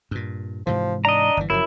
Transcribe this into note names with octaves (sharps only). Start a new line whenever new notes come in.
G2 A#2
G#2 C3 E3 F3
D4 D#5 A#5
G1 E3
F#1 F#2 F3 E4